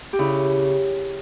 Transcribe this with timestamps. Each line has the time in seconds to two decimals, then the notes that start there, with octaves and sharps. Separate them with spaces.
0.13 G4
0.19 C#3 E4